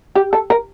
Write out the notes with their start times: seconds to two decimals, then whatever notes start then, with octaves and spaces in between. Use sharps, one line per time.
0.15 G4
0.33 A4
0.50 A#4